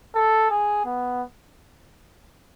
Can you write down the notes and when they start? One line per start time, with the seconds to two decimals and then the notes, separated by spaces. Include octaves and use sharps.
0.15 A4
0.50 G#4
0.85 B3